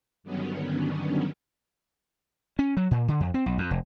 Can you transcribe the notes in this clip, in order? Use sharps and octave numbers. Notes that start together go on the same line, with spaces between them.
G2 D3 D#3 F#3 B3 C#4
C#4
F#3
A#2
D3
F2
C4
B1
F2
F1